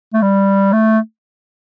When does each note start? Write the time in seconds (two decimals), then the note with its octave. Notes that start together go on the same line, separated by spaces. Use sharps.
0.13 A3
0.22 G3
0.73 A3